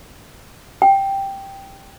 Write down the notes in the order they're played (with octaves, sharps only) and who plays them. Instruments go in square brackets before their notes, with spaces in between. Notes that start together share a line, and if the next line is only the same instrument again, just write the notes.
[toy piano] G5